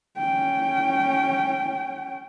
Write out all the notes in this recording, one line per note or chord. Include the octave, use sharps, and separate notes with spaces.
C#4 G5